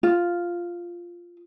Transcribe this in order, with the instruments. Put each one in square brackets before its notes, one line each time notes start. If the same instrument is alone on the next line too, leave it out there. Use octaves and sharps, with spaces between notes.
[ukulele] F4